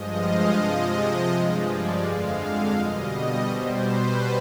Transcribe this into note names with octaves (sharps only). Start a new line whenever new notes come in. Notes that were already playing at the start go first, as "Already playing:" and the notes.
Already playing: G2 F3 G#3 D#5
F5
C3 F3 G#3 D#5
G2 F3 G#3
D5
F2 D3 G#3 F5
F5
B2 G3 D#5
B2 G3 C5
B4